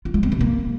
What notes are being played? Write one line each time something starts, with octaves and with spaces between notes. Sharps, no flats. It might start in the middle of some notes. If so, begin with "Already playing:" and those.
F4
G#3
C4
C3
A#3